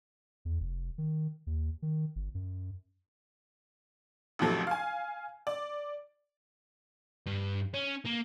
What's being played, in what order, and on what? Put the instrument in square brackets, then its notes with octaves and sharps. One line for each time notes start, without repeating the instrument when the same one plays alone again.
[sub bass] E2
F1
D#3
D#2
D#3
G1
F#2
[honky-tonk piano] A1 D#2 C3 F3 F#3 A3
F5 G#5
D5
[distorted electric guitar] G2
C#4
A#3